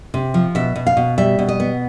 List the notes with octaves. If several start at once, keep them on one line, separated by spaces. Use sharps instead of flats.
C3
F3
B2 E5
B2
F5
B2
G3 E5
B2
D#5
B3